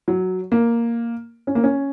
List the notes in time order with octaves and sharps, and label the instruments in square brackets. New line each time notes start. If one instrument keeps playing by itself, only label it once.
[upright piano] F#3
A#3
C#4
A#3
C#4